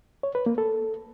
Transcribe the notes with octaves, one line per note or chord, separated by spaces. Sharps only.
C#5
B4
A#3
A4